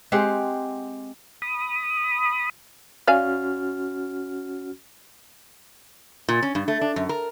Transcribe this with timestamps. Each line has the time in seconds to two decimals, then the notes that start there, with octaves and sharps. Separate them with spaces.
0.12 G#3 C4 G4 F#5
1.42 B5 D#6
3.07 C#4 F#4 D5 F5 G#5 F6
6.29 A#2
6.43 C#4
6.55 G2
6.68 A3
6.81 D4
6.96 F#2
7.09 A#4